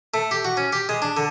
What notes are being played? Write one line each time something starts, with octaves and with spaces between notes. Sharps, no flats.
A3
G4
F#4
C#4
G4
G#3
D4
D3